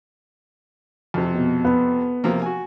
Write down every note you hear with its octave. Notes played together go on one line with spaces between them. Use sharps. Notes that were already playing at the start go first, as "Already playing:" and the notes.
F2 C3
B2
B3
C3 F3 A#3
F#4 G#5